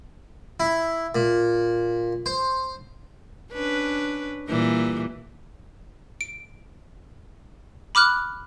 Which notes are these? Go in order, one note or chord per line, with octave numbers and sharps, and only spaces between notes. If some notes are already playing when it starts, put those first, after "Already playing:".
E4
A#2
C5
C#4 D4 B4
A#2 E3 G3
D7
B5 D6 F6 F#6